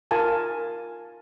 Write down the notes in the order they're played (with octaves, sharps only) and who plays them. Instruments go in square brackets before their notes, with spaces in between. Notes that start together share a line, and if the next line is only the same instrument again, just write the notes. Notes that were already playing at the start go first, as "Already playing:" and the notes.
[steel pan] F4 A#4 F5 G#5 A5